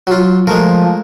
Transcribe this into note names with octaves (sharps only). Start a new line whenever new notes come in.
F#3 F4
F3 G#3 A3 A#4